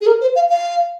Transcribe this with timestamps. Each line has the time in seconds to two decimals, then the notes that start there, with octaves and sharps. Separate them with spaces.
0.01 G#4
0.06 A#4
0.21 C5
0.35 F5
0.50 F5